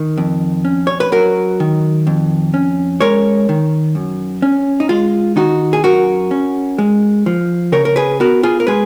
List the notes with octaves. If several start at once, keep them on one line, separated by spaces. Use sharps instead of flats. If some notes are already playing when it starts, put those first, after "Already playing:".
Already playing: D#3
F2
C#4
C#5
B4
F#3 F#4 A#4
D#3
F2
C#4
G#3 A#4 C#5
D#3
F#2
C#4
D#4
G#3 F4
D#3 D#4 F#4
G#4
F#2 F#4 A#4
C#4
G#3
F3
C#3 A#4 C#5
A#4
G#4 B4
B3 F#4 A#4
F4 G#4
A#4
G#3 G#4 B4